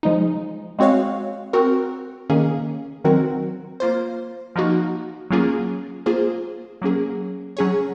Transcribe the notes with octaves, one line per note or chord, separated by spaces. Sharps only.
F3 G#3 D#4
G#3 C4 F#4 C#5 F5
C4 F#4 A#4
D#3 A#3 C#4 G#4
D#3 F#3 C4 F#4 A#4
A#3 F4 C5
F3 A#3 D#4 F#4
F#3 A#3 C#4 F4 G#4
A#3 F4 G#4 C5
F#3 A#3 C#4 G#4
F#3 C#4 G#4 C#5